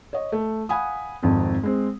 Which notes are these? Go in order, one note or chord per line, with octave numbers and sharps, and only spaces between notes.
C#5 D#5
A3
F5 F#5 G#5 B5 D#6
G#1 F2 C4
G#3 C4